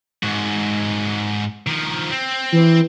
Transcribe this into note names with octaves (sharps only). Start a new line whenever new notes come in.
G#2 F#4
D#3 F3
C4
E3